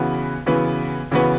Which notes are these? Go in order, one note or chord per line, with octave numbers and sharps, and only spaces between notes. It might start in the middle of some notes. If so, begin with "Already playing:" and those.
Already playing: C#3 E3 B3 F#4 B4
C#3 E3 B3 F#4 B4
C#3 E3 B3 F#4 B4